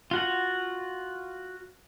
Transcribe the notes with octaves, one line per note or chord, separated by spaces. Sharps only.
F4 F#4 F#5